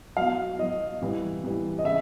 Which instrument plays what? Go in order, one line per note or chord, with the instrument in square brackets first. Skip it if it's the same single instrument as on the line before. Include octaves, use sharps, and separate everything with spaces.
[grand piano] B2 F#3 F5
B2 F#3 D#5
C3 E3 G3
C3 E3 G3
D#5
C#3 E5